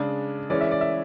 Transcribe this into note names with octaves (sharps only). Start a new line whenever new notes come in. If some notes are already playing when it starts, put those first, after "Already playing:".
Already playing: C#3 G#3 D4
E3 G#3 C#4 D5
E5
D5
E5